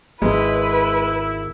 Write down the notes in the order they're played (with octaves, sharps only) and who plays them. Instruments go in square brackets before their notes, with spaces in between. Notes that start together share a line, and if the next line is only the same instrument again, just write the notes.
[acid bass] G#1 [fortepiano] G#3 [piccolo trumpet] E4 [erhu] B4